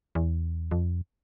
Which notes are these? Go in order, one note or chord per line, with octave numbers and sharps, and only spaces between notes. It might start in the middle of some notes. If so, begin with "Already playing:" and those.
E2
F2